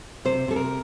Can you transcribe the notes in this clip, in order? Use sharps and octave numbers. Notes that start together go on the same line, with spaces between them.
C3 C5
C3 A4
A#4